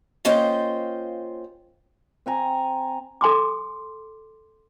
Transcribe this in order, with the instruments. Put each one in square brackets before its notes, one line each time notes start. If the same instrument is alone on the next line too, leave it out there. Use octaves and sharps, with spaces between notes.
[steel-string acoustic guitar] A#3 C#4 F4 C5 D#5 G5
[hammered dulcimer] C4 G#5 A#5
[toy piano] A4 G#5 C6 D6